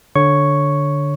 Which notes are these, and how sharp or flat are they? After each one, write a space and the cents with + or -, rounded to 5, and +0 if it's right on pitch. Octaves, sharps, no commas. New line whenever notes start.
D3 +0 C#5 +0 C#6 +0